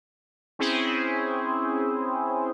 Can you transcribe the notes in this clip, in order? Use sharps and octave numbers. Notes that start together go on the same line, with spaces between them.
C4 C#4 E4 G#4 C5